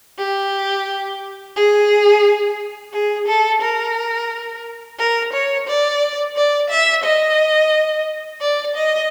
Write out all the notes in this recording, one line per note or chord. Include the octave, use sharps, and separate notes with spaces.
G4
G#4
G#4
A4
A#4
A#4
C#5
D5
D5
E5
D#5
D5
D#5